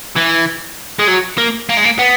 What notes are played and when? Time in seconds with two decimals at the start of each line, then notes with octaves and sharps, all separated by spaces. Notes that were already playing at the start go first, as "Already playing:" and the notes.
0.16 E3
0.99 G#3
1.08 F#3
1.38 A#3
1.69 A#3
1.77 G#3
1.84 A#3
1.99 B3